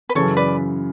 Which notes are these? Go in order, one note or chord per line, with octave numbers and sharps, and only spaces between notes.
B4
F#2 C#3 E3 A4 C#5
B4 D5